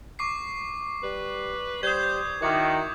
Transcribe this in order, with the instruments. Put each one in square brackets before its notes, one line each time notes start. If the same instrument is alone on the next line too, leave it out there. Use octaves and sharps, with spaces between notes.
[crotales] C#6 D6 C7
[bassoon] G3 [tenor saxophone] B4
[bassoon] G3 [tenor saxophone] C5 [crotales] D#6 G6 G#6
[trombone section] D#3 [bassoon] E4 [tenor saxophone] F#4 [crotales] D6